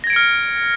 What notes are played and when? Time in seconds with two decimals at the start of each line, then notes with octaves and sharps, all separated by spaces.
0.04 A#6
0.07 G#6
0.10 D7
0.13 C#7
0.16 F6